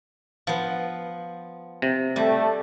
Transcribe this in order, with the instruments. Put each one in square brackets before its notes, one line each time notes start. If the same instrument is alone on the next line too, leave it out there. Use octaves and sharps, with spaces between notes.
[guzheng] F3 B3
[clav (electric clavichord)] C3
[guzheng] G3 [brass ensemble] A3